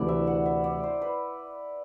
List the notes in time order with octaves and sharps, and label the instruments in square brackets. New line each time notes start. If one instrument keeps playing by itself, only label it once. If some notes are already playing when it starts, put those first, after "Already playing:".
Already playing: [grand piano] D2 C3 E3 [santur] E4 D5
[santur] E5
F#5
E5
D5
C5
B4